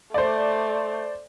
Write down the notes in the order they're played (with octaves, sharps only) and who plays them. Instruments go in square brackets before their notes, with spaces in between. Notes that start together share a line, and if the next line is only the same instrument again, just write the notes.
[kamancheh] A3 [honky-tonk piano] C5 D5